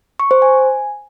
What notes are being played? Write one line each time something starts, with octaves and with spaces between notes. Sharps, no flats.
C#6
C5
G#5